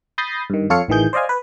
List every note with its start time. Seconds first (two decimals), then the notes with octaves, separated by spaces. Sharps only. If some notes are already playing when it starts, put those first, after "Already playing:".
0.18 B5 D#6 G6 A6 A#6 C7
0.50 G2 D#3
0.70 F2 F4 A4 C#5 F5 C#7
0.88 A1 D#3 E3 G#4 G6
1.13 C5 D5 D#5 F5 G#5
1.29 B4